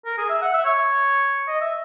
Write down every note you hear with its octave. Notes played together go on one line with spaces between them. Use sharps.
A#4
G#4
E5
F#5
E5
C#5
D#5
E5